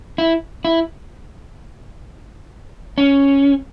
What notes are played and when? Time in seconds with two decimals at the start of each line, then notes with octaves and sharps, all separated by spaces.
0.18 E4
0.65 E4
2.98 C#4